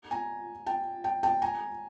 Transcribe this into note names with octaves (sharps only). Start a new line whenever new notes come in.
G#5 A#5
G5 A5
G5 A5
G5 A5
G#5 A#5